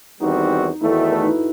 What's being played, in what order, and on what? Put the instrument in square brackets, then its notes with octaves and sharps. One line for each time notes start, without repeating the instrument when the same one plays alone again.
[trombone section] E2 D#3 G3 C4 F#4 [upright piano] D#4
[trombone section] E2 D#3 A3 [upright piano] E4
[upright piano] F#4
A4
B4
D#4
E4